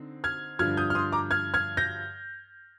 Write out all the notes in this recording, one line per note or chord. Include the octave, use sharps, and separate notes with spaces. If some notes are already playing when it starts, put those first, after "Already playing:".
Already playing: D3 C4 D#4
F6 G#6
G2 D3 F3 F6 G#6
D#6 G6
F6
C6 D#6
A#5 D6
F6 G#6
F6 G#6
G6 A#6